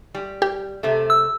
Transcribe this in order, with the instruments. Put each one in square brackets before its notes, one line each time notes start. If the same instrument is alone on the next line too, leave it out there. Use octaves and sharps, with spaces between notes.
[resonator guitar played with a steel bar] G3
[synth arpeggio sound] G4
[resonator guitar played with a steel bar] C3 A3
[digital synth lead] E6